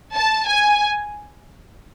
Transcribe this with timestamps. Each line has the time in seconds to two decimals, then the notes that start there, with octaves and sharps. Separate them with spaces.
0.15 A5
0.48 G#5